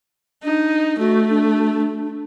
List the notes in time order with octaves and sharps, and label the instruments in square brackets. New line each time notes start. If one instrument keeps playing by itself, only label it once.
[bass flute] D4 [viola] D#4
[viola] A3 [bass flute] F#4
[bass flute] D4